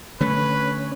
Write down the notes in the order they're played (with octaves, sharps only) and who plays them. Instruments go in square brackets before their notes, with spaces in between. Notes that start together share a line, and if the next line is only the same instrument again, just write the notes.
[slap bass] D3 A3 [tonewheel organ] C#4 [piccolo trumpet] B4